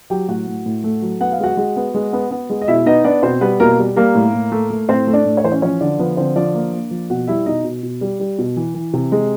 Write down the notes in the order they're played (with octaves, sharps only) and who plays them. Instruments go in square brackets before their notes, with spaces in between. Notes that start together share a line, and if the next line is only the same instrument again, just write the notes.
[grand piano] F#3 G4 G5
A2 F#4 F#5
A2
A2
A3
F#3
B3 F#5
F5
G#3 F#4 F#5
G#3
B3
G#3
B3
B3
G#3
D#5
B2 E4 E5
B3 D#4 D#5
B3 D4 D5
B2 C4 C5
G3 B3 B4
B2 A#3 A#4
G3
G3 A#3 A#4
A2
A2
A3
A3
A2 C4 C5
A3
D4 D5
A2
C#5
E3 C5
C#4 C#5
F3 C#4 C#5
D3 D4 D5
F3 B3 B4
D3 C4 C5
F3 D4 D5
A#3
A#3
F3
B2 F#4 F#5
G3 E4 E5
B2 D#4 D#5
B2
B2
G3
G3
B2
E3
E3
C3
G#3